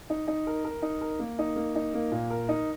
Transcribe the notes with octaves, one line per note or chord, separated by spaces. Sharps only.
D#4
D#4
A#4
A#4
D#4
A#4
A#3
D#4
A#3
D#4
A#3
A#2
A#4
D#4